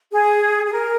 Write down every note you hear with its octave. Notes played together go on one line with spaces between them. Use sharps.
G#4
G#4
A#4